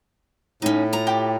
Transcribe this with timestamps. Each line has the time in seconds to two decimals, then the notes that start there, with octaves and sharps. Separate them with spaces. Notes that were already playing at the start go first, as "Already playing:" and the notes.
0.62 A2 C#4 D#4
0.93 F4 A#5
1.07 G4